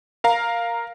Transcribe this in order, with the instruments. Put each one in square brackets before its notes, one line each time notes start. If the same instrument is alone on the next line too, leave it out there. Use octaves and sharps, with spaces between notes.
[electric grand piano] A#4 F5 A#5